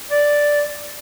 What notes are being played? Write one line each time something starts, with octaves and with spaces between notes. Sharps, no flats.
D5